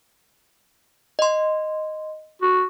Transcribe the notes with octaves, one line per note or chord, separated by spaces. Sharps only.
D#5 C6
F#4